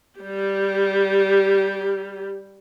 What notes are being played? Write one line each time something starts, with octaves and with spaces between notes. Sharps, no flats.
G3 G4